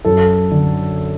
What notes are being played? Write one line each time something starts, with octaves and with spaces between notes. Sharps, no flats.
F#2 A4
D3